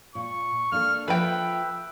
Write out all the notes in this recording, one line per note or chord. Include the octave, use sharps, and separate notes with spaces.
A#2 C#6
A#3 D4 A4 F6
F3 A4 B4 E5 G5